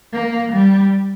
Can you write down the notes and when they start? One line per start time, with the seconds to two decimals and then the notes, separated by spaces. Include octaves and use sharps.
0.13 A#3
0.53 G3